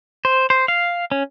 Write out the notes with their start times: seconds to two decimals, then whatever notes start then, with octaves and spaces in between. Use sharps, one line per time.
0.25 C5
0.50 C5
0.68 F5
1.12 C#4